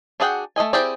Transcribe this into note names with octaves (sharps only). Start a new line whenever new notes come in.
D4 F#4 G#4 F#5 G5
A3 F4 D#5 G#5
C4 E4 G4 G#4 D5